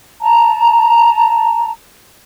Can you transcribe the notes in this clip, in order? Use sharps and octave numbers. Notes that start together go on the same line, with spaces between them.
A5 A#5